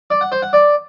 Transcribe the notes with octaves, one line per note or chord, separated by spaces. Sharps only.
D5
F#5
C5
F#5
D5